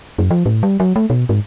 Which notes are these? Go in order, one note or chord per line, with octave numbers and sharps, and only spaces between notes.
F#2
F3
A2
G3
F#3
A3
B2
G#2